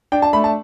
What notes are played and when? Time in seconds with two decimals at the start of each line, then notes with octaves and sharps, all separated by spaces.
0.12 D4 G5
0.22 A5
0.33 A3 B5
0.44 A5